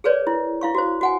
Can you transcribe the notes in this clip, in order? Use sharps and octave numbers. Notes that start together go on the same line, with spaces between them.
G#4 A#4 B4 C#5 D5
E4
E4 F5 C#6
F#4 C5
F#4 F#5 G#5